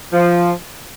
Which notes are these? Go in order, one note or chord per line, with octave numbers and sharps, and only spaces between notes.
F3